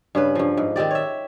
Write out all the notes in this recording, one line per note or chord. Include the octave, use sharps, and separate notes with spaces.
G2 C#3 B4
G2 F3
G#2
D#3 C4 G4 D5
C#5 E5